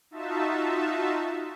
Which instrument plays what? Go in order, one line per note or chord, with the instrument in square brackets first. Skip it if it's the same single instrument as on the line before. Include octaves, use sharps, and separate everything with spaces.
[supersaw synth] D#4 F4 F#4 E5 A5